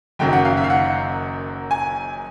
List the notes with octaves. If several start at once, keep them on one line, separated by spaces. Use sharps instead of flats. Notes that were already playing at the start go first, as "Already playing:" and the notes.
F#1 F#2 D#3 F#3 G5
F#5
F5
E5
F5
F#5
G#5